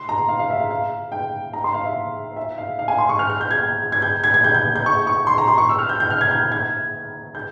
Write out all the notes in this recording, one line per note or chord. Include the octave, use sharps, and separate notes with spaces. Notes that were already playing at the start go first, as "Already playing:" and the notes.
Already playing: C6
A#5
F5
F5
E5
F5
F5
G5
A#5
C6
F5
E5
E5
F5
F5
G#5
C6
C#6
F6
F6
G6
G#6
G#6
G6
G#6
G#6
G6
G6
G6
C#6
C#6
C6
A#5
C6
C#6
E6
F6
G6
G6
F6
G#6
G6
G#6
G6